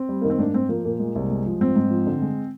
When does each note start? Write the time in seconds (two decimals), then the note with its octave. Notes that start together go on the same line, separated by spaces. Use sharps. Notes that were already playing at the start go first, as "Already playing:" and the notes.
Already playing: C4
0.09 G3
0.22 D#3 A#3
0.30 C4
0.38 G#2 A#3 D4
0.54 G#2 C4
0.69 F3 A#3
0.85 A#2 A#3
1.00 G#3
1.15 C2
1.31 G#3
1.46 F3
1.61 G#2 C4
1.76 G#2
1.91 F3
2.07 D3
2.22 G#3